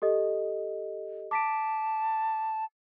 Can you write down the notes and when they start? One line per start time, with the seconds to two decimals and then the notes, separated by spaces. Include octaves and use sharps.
0.02 G4 A4 D#5
1.31 A5 D6 B6 D7